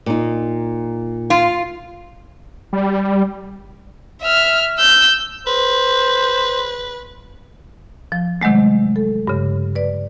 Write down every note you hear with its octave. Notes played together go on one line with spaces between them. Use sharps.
A#2 D#4
F4
G3
E5 F6
E6 G6
B4 C5
F3
C3 D#3 F#3 G#3 A3
A4
G2 C#3
B4 D5